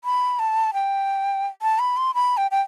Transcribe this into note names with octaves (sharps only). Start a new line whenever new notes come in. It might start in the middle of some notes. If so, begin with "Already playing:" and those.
B5
A5
G5
A5
B5
C6
B5
G5
G5